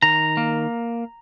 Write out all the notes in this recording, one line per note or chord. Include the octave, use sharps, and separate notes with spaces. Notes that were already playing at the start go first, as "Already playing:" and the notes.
D#3 A#5
A#3